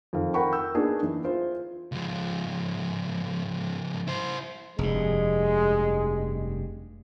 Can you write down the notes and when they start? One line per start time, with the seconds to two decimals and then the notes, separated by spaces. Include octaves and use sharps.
0.13 F2 D#3 F5
0.34 A#4 F#5 G5 B5 C#6
0.52 E6 G6
0.74 A#3 B3 D4 D#4 G#4
1.03 E3
1.24 F4 C5
1.92 C#2 F3
4.07 E4 C5
4.79 F1 G2 G#3